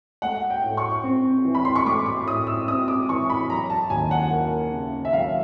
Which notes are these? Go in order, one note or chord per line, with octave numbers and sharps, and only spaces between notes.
A3 F#5
G5
A2
C#6
C4
E3
B5
C6
C#6
A3 D6
D6
A2 D#6
E6
C4 D#6
D6
E3 C#6
B5
F#3 A#5
A5
D#2 G#5
F#5
A#3
C#3
E5
F#3 F5